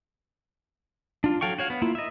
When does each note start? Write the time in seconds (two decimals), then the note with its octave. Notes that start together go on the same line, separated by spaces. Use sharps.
1.24 D4 F4
1.41 F#3 A4 F5 G5 C#6
1.59 F#4 C#5 F5
1.70 B3
1.82 A#3 E4 F4
1.95 D#5 E5